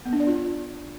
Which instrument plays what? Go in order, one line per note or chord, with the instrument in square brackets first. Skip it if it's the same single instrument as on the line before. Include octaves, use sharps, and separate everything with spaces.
[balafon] B3
D4
D5
F4